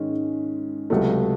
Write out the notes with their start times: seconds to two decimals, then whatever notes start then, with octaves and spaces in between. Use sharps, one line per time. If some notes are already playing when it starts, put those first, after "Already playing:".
Already playing: G#2 D#3 G#3 C#4
0.90 C#2 C3 F#3 A3